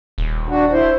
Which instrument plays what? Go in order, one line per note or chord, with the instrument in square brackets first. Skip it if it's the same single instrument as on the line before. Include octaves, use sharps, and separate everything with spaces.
[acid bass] D#1
[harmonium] D4 F#4
E4 C5